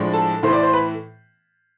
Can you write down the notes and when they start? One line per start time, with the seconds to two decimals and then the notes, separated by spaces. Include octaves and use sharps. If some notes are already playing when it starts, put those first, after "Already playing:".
Already playing: A2 F3 G#3 D4
0.13 A4 A5
0.43 A2 E3 A3 C5 C6
0.53 D5 D6
0.63 C5 C6
0.73 B4 B5